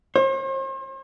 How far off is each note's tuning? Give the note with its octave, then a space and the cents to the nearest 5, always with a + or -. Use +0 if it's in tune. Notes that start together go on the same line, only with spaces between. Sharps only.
C5 +45